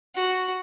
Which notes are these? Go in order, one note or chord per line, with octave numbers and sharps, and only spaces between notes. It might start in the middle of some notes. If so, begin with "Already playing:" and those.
F#4